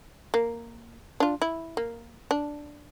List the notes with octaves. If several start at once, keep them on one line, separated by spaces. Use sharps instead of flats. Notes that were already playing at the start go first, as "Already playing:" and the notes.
A#3
D4 F4
E4
A#3
D4